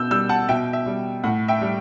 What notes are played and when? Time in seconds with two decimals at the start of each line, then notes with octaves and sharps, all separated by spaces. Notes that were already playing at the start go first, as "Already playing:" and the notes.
Already playing: B2 E6 G6
0.11 G3 E6 G6
0.29 F#5 A5
0.49 B2 E5 G5
0.73 E5
0.86 G3
1.24 A2 F#5
1.48 E5 G5
1.61 G3